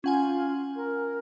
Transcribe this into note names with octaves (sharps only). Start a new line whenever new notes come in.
C#4 F4 F#5 G#5
A#4